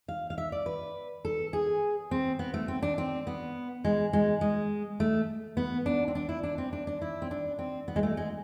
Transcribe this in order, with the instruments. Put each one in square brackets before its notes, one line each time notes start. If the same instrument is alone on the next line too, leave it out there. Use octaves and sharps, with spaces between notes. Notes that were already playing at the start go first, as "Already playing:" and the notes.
[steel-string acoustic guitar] F5
F5
E5
D5
B4
A4
G#4
C4
B3
A3
C4
D4
C4
B3
G#3
G#3
G#3
A3
B3
D4
C4
D4
E4
D4
C4
D4
D4
E4
C4
D4
C4
B3
G#3
A3
G#3